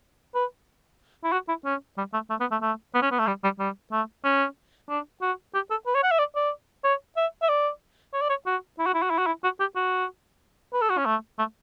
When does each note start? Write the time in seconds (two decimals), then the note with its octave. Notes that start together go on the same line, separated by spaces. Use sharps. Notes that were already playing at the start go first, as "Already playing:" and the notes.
0.35 B4
1.24 E4
1.32 F#4
1.48 E4
1.65 C#4
1.98 G3
2.13 A3
2.30 A3
2.40 B3
2.51 A3
2.62 A3
2.94 B3
3.02 C#4
3.11 B3
3.19 A3
3.27 G3
3.43 G3
3.59 G3
3.92 A3
4.24 C#4
4.89 D4
5.22 F#4
5.54 G4
5.70 A4
5.86 B4
5.94 C#5
6.03 F#5
6.11 E5
6.19 D5
6.35 D5
6.84 C#5
7.16 E5
7.42 E5
7.49 D5
8.13 C#5
8.21 D5
8.29 C#5
8.46 F#4
8.79 E4
8.86 F#4
8.94 E4
9.02 F#4
9.10 E4
9.18 F#4
9.26 E4
9.44 F#4
9.60 G4
9.76 F#4
10.73 B4
10.82 A4
10.89 F#4
10.98 C#4
11.06 A3
11.38 A3